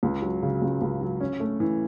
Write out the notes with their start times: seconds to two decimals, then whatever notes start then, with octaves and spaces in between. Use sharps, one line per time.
0.03 C#2
0.22 F#3
0.42 C#3
0.62 C#2
0.81 C#2
1.01 F#3
1.20 C#4
1.40 A3
1.60 E3